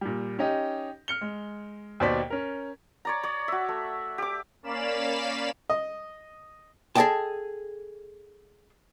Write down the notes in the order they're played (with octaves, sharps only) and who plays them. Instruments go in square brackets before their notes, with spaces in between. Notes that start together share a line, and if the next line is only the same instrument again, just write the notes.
[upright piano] A#2 G3
C#4 D#4 G4 D#5
F6 C#7 G7
G#3
D#2 B2 C5 D5 B6
C#4 A#4
[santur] C#5 D5 A#5
C#5 D5
F#4 E5
A3
G4 D6
[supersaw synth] A#3 C#4 D5 F5 B5 E7
[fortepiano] D#5
[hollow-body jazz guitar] G#4 A4 D5 D#5 G5 A5